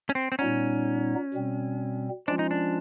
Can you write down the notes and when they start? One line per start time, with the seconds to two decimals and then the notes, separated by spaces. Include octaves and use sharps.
0.10 C#4
0.15 C4
0.32 C4
0.39 A#2 G3 B3 C#4 D#4
1.34 B2 G3 C4
2.28 F3 G#3 C#4 D4 F4
2.39 D#4
2.51 D4